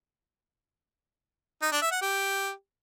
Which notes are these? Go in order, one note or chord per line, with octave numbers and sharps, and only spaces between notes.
D#4
D4
E5
F#5
G4